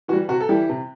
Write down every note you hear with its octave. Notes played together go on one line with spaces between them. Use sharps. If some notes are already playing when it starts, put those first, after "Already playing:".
E3 G3 F#4
C3 F#4
A4
E3 G3 E4 G4
C3